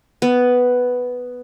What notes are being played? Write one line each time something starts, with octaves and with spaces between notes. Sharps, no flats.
B3